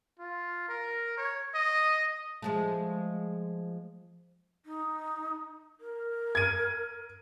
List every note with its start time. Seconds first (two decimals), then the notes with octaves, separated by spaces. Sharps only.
0.19 F4
0.69 A#4
1.17 C#5
1.55 D#5
2.42 F3 G#3 A3
4.66 D#4
5.81 A#4
6.35 G#6 D#7